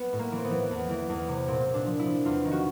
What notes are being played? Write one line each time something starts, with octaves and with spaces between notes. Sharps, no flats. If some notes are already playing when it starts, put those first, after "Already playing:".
Already playing: B3
A2
A#3
E3
C4
B3
E3
E2
E3
E2
C3
A#2 C4
A#2
D4
F3
E4
F3
E2 F4
D#3
F#4